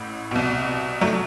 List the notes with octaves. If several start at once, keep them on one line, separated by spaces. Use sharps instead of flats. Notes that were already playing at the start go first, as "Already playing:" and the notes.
Already playing: A1 A2
C2 B2
F#3 A3